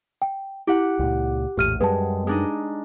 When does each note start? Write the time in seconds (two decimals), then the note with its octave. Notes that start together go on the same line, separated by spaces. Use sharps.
0.22 G5
0.67 E4 G4 F#5
0.99 C#2 A#2
1.57 A#1 E2 A2 G4 F6 D#7
1.81 F#2 G3 G#3 B4 A5
2.27 G#3 D4 D#4